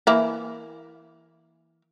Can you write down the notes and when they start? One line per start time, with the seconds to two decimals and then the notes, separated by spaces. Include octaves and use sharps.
0.07 E3 A#3 E4